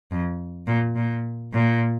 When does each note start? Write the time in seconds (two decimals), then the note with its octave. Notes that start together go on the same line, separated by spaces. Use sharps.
0.12 F2
0.67 A#2
0.95 A#2
1.53 A#2